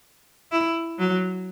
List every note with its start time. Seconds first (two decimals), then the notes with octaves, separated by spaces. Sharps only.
0.52 E4
0.99 F#3